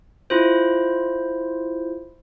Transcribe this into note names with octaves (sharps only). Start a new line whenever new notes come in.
E4 F4 C5